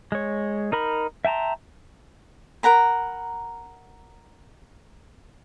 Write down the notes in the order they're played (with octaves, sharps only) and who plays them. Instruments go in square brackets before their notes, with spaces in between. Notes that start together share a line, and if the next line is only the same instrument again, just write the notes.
[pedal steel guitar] G#3 C#5
D#4 A#4 B5
E5 G5 A5 A#5 C6
[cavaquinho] A#4 F#5 A#5 B5